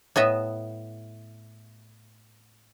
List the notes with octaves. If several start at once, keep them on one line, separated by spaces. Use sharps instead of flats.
A2 B3 D#5 E5